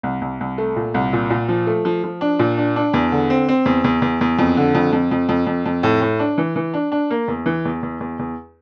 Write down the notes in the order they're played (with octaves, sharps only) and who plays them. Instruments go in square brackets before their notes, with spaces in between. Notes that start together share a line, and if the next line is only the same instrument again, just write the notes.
[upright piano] C2
C2
C2
A3
A#2
C2
A#2
A#2
F3
A3
F3
F3
D4
A#2
D4
D4
E2
D3
C4
C4
E2
E2
E2
E2
F2
D3
F2
F2
F2
F2
F2
F2
A2
A2
D4
E3
E3
D4
D4
A#3
E2
E3
E2
E2
E2
E2